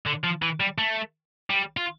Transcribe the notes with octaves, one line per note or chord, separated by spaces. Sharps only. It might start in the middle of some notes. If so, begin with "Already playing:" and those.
D3
F3
E3
G3
A3
G3
F4